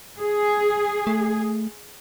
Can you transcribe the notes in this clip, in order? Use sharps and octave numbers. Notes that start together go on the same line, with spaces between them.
G#4
A3